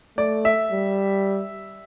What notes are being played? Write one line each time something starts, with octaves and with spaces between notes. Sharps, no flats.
A3 D5
E5
G3